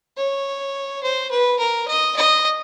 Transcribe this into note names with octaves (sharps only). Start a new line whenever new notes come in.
C#5
C5
B4
A#4
D#5
D#5